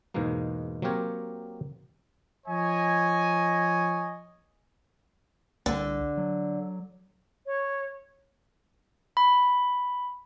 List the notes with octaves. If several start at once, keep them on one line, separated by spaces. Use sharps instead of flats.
E2 G#2 B2 G#3 A#3
F#3 A#3 C4 G4 A#4 C#5
F3 C#5 D#5 G#5
C2 D3
F#3
C#5
B5